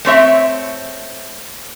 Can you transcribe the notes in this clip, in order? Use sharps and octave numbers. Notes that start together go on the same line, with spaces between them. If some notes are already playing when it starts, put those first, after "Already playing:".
A3 C4 C#5 E5